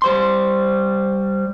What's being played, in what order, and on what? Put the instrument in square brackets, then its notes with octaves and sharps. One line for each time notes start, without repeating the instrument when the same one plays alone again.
[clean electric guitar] G3 C5 C6